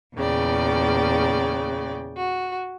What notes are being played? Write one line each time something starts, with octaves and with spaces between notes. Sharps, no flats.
E2 A#2 C#3 D5 G5
F#4